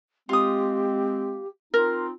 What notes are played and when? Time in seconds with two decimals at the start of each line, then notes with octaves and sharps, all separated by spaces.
0.29 G#3 C4 F4 G4 D#6
1.74 C4 D#4 F4 A#4